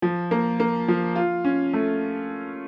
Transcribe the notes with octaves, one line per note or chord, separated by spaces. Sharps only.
F3
A#3
A#3
F3
F4
C#4
A3